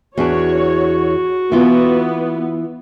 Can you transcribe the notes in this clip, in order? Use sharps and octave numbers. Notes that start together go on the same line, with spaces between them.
E2 D4 F#4 C#5
E3 B3 F4